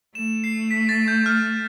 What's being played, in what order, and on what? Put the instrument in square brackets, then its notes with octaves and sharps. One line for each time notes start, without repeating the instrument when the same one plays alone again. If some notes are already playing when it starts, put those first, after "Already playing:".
[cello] A3 [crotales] E7
[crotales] C7
B6
A6
G6
F6